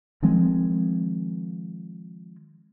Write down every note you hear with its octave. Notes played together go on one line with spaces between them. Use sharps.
D#3 F3 G#3 C4